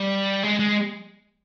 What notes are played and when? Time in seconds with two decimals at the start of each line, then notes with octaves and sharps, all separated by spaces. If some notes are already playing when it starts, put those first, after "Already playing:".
Already playing: G3
0.43 G#3
0.59 G#3